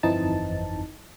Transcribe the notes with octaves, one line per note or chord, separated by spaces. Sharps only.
G1 F2 E3 C4 D#4 A5